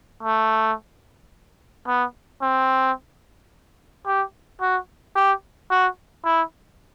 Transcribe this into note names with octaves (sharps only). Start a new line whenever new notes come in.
A3
B3
C4
G4
F#4
G4
F#4
E4